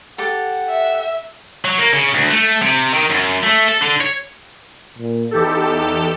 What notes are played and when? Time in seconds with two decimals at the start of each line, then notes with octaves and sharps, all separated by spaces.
0.18 G4 A4 F#5
0.70 E5
1.65 F#3
1.78 A#3
1.93 C#3
2.14 D2
2.30 A3
2.62 C3
2.94 D#3
3.10 F#2
3.43 A3
3.68 A4
3.82 D3
4.00 C#5
4.98 A#2
5.31 E2 D#4 G4 A4